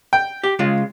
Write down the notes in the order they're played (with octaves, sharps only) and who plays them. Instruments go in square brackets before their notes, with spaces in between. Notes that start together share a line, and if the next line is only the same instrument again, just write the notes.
[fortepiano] G5
[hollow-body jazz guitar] G4
C#3 G#3 F4